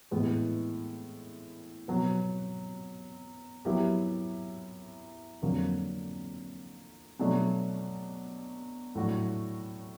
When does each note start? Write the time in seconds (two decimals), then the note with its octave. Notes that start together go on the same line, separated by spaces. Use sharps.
0.11 A2 E3 G#3 B3
1.88 B2 F#3 B3
3.65 F#3 B3 E4 G4 A#4
5.42 F2 D3 F#3 A#3
7.20 B2 F#3 A3 D4
8.95 A2 F#3 A3 D4 F#4